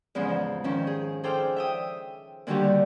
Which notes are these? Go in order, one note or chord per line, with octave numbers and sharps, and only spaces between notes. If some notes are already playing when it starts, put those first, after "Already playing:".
E2 G#2 C#3 F3
D#3 F3 C#4
G#4
G#4 A4 C5 G5 D6 F6
E5 G5 D#6
A#2 D3 D#3 G3 F#4 G4